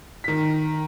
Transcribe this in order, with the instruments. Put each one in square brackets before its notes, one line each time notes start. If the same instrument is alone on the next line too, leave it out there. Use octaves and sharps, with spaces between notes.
[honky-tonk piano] D#3 B6